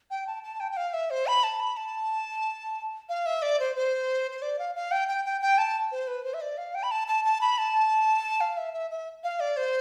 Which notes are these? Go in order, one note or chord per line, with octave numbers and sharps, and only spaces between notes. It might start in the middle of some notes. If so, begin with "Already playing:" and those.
G5
A5
A5
G5
G5
F5
E5
C5
B5
A5
B5
A5
F5
E5
D5
C5
C5
C5
D5
F5
F5
G5
G5
G5
G5
A5
C5
B4
C5
E5
D5
F5
G5
B5
A5
A5
A5
B5
A5
F5
E5
E5
E5
F5
D5
C5